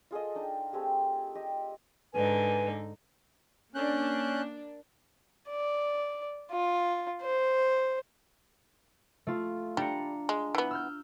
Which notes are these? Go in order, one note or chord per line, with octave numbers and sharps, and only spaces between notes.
F4 G#4 A4 D#5
D4 D#4 G5
A3 C4 G4 G#4
G4 D#5
G#2 D3 D#4 B4 G#5
A#3 C#4 D4 F#6 G6
D5
F4
C5
A3 F4
G3 D4 A#5 C#7
G#3
E3 B3
E6 F6 G6